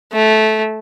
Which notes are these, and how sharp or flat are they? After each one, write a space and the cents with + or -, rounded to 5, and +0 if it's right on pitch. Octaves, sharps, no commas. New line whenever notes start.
A3 -15